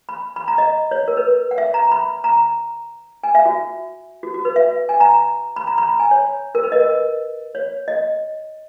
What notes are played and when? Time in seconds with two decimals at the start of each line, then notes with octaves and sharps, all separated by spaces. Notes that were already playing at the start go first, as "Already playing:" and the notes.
0.09 B5
0.36 B5
0.48 A#5
0.58 D#5
0.91 C#5
1.08 A#4
1.17 B4
1.51 F#5
1.58 E5
1.74 A#5
1.92 B5
2.24 A#5
3.24 G#5
3.35 E5
3.45 F#4
4.23 F#4
4.34 F#4
4.45 B4
4.56 E5
4.89 G#5
5.00 A#5
5.56 B5
5.67 A#5
5.78 B5
5.89 A#5
5.99 G#5
6.11 C#5
6.55 A#4
6.63 B4
6.72 D#5
6.80 A#4
7.55 C#5
7.88 D#5